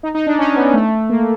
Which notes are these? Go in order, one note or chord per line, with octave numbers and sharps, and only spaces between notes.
D#4
D#4
D4
C#4
B3
A3
A#3